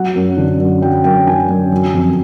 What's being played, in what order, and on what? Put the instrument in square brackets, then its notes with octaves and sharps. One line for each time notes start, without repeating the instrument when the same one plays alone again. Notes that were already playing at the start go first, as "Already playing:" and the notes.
Already playing: [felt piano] F#3 F#5
F#2
D3
F#2
F#3 G5
F#2 G5
D3 G#5
F#2
F#3
F2